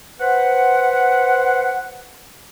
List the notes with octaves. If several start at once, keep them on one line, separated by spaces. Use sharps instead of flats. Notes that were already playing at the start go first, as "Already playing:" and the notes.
B4 C5 F#5